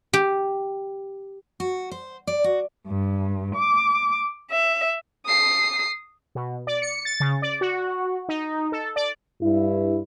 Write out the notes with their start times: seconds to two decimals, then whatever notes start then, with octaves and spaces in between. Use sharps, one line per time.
0.13 G4
1.60 F#4
1.91 C5
2.27 D5
2.44 F#4
2.88 G2
3.55 D6
4.52 E5
5.26 D#6 C7
6.35 B2
6.67 D5
6.82 C#7
7.05 A6
7.20 C#3
7.42 D5
7.61 F#4
8.29 D#4
8.72 A4
8.96 D5
9.42 G2 E4